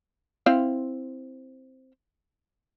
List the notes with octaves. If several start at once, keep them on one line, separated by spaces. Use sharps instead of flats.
C4 E4 F5